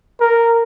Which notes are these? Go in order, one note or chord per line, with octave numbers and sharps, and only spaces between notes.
A#4